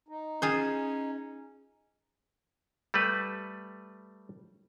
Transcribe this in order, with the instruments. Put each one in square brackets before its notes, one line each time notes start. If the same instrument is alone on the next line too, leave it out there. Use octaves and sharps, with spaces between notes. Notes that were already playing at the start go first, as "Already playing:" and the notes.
[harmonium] D#4
[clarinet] C#4 [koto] F4 G#4 C5
[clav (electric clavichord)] G3 A3 B4